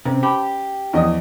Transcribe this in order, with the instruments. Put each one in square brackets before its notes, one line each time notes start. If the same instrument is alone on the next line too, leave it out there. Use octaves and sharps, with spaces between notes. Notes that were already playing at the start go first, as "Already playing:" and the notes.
[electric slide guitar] C3 [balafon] C#4 B4 C5
[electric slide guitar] G4 [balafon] A5 B5 D6
[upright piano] E2 D#5 D#6 [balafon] E3 F3 E4